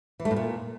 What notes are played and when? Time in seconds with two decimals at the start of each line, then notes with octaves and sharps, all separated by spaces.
0.20 E3
0.25 A3
0.31 A2
0.36 A#2